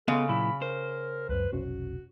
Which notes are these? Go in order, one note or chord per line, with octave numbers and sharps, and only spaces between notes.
C#3 B3 A4 D#5 F5
A#2 F#3 E4 B5
A#4 C5
C#2 F#2 B4
F1 B1 C#4 F#4